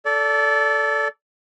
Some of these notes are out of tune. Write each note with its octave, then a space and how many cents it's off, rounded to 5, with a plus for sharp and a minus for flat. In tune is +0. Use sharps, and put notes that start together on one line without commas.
A4 +0 D5 -25